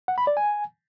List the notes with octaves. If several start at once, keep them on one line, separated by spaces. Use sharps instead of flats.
F#5
B5
D5
G#5